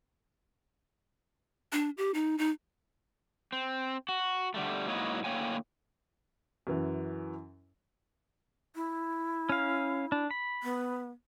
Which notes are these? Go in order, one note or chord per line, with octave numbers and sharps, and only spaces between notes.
D4
G4
D#4
D#4
C4
F#4
D3 G3 A3
G#2 F#3 A#3 E4 C#5 D#5
A2 D3 A#3 C#5 G5 G#5
F#2 E3
E4
C#4 F5
D4
B5
B3